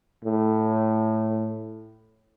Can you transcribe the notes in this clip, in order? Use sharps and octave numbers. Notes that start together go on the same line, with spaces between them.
A2